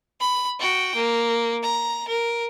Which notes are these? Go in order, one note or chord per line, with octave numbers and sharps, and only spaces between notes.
B5
F#4 G5
A#3
A#5
A#4